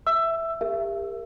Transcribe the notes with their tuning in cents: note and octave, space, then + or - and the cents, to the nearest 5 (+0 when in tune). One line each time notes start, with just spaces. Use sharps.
E5 +0 E6 +15
G4 +35 A#4 -10 E5 +35